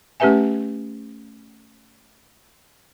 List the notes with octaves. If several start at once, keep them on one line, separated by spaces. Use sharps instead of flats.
A3 C#4 G4 B4 E5 G#5